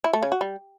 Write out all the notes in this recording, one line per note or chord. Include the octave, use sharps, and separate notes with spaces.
E4
A3
C#3
F#4
G3